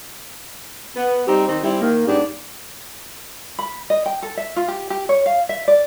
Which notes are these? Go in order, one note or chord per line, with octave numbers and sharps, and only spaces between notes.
B3
G3 C4 D#4 G4
D#3 C4 D#4 G4
G3 C4 E4
D#3 A#3
G#2 B3 D4 G4
B5
D#5
G5
A4
E5
F4
G4
G4
C#5
F5
E5
D5